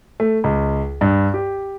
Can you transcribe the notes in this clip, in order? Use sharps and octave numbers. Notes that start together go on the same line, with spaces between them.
A3
C#2
G2
G4